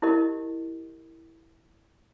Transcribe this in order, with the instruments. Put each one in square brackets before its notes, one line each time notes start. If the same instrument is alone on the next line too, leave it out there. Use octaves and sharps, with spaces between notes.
[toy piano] E4 G4 A#4 D#5